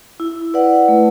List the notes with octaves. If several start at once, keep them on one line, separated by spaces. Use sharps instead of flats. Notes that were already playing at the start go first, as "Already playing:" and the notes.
E4
B4 D5 F#5
A3